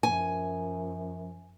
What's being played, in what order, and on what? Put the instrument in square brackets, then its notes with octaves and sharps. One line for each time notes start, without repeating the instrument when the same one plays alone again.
[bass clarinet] F#2 [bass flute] F3 [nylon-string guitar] G#5